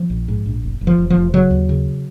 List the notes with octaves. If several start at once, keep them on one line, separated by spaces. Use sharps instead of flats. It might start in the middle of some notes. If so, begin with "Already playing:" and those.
Already playing: F3
A#1
G#2
A#1
F1
F1
F3
F1
F3
F1
C#3 F#3
D#2
C#3